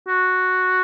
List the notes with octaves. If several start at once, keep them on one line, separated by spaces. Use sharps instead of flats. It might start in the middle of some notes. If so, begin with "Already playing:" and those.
F#4